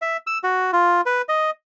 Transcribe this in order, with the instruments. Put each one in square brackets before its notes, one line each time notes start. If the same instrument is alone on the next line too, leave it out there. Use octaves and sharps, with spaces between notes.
[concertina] E5
E6
F#4
F4
B4
D#5